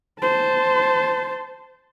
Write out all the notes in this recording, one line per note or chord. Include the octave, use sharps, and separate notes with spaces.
C5 A5